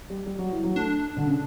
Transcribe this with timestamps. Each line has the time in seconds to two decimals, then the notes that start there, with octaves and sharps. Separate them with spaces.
0.10 G3
0.26 G3
0.38 F#3
0.52 E3
0.63 F#3
0.76 A3 D4
1.17 D3
1.26 C#3